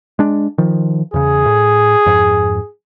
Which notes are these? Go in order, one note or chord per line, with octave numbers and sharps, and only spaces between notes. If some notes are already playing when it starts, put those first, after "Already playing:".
G#3 D4
D#3 F3
E2 C#3 G#4
A2
F2 G#2